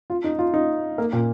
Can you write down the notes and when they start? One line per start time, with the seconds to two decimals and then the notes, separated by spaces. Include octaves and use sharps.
0.10 F4
0.24 D#4
0.39 F4
0.54 D#4
0.98 A#3
1.13 A#2